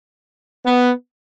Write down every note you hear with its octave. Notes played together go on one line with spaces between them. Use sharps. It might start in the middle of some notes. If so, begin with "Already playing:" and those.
B3